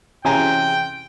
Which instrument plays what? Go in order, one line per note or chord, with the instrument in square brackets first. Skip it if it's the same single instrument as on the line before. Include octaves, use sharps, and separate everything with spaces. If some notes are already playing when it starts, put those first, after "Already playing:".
[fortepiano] C3 G#5 A#5 [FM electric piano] E3 C#4 G#4 [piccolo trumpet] G5